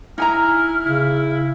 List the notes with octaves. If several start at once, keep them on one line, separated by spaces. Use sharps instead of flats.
D#4 E4 G#5 A#5 F6
C#3 E4